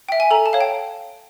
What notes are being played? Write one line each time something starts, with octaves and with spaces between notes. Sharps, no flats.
G5
E5
G#5
A4 A#5
A5
C#5 F5
G5